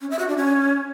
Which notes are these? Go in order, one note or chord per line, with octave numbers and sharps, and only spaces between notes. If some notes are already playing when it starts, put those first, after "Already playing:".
C#4
E5
F#4
D4
C#4